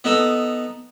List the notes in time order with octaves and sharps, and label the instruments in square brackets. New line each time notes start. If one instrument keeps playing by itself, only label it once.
[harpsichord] B3 D#4 A4